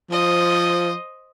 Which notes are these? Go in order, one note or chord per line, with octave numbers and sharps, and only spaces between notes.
F3 C5 D#5